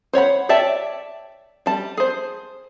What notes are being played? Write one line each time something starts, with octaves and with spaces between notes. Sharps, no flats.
C5 C#5 F#5 B5
C#5 D5 E5 G5 A5
G3 A5
G#4 C5